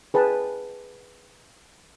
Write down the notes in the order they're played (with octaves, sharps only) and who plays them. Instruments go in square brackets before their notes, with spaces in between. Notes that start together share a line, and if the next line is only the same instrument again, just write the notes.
[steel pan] G#4 B4 G5 A5